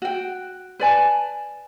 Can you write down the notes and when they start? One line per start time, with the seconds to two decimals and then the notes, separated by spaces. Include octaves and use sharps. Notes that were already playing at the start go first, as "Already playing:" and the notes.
0.02 F#4 G5
0.80 B4 D5 G#5 A5